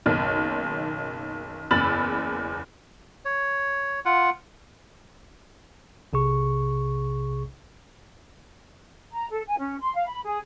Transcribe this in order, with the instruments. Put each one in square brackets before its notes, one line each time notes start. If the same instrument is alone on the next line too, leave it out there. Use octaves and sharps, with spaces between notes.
[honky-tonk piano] F#1 B1 D#3
F#1 E2 B5 E6 A6 F#7
[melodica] C#5
F4 F#5
[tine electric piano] B1 C3 G#4 C#6
[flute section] A#5
A4
G#5
C#4
C6
F5
B5
G#4